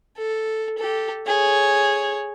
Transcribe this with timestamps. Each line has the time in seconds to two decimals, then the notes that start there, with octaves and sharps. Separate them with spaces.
0.17 A4
0.78 G4 A4
1.27 G#4 C#5